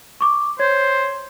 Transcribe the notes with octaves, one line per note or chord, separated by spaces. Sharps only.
C#6 D6
C5 C#5 G#6